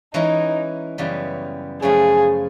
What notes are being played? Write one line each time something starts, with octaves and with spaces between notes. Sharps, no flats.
E3 G#3 C#4 D#4 E4
F#2 C#3 E3 G3 B3
F#2 C#3 F3 A3 G#4